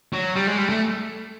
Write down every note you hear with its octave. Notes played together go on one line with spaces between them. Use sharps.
F#3
G3
G#3
G3
A3